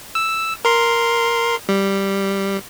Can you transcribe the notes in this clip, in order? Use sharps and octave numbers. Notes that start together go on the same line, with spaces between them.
E6
A#4 C6
G3